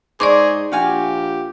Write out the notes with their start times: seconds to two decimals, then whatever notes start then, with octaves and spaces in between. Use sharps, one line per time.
0.20 G#2 D#4 G#4 C5 D5 C#6 D6
0.72 A#1 F#4 G4 F5 G#5